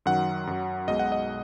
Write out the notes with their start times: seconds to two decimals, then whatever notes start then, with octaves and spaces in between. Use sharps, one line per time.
0.06 F#2 D#3 F#3 F#5
0.47 F#2 F#3
0.88 B1 B2 G#3 D#5
0.99 F#5
1.12 D#5